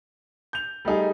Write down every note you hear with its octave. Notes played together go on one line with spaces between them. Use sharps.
G6 F7
G3 A3 D#4 G#4